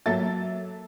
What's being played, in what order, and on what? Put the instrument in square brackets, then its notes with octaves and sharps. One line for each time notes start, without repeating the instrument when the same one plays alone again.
[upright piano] F#3 A#3 A4 E5 A6